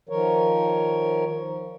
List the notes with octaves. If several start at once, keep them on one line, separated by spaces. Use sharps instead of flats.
D#3 F3 A#4 C#5